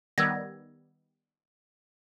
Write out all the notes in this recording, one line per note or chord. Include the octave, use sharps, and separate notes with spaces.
D#3 G3 B3 E6 G#6 A#6